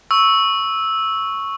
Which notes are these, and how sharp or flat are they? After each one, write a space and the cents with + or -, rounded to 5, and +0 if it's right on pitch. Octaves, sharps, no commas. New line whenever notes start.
C#6 +0 E6 -10